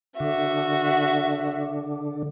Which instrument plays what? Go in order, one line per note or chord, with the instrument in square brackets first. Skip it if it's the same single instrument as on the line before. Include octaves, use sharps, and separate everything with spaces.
[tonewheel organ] D3 [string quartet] F#4 E5